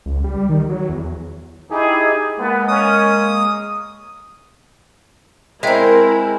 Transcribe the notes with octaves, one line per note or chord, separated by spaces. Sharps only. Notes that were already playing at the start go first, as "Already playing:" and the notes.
C#2
G3
D#3
F#3
E2
D#4 E4 G4 G#4
G#3 A#3 B3
C#4 D#6
G#3 C4 E4 A#4 D#5 E5 G5